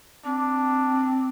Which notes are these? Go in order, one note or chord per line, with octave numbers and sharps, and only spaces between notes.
C4 D4